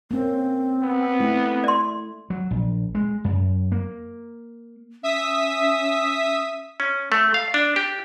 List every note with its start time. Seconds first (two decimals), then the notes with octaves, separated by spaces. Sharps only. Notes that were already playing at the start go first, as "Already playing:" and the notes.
0.11 A#3 C4 C#4
0.83 B3
1.20 A3 E4
1.64 D5 C6
2.30 F#3
2.51 A#1
2.95 G#3
3.24 F#2
3.72 A#3
5.03 C#4 E5 D#6 B6
6.80 C#4
7.12 A3
7.34 F5
7.54 D4
7.76 G4